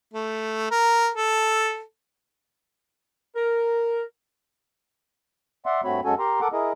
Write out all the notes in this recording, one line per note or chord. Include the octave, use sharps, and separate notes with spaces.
A3
A#4
A4
A#4
D5 E5 F#5 C6
G2 A3 C4 F#4 C#5 B5
F#2 G#3 C#4 F#4 A4 G#5
G4 A#4 A#5 C6
A4 A#4 F#5 D6
E4 G#4 A#4 D#5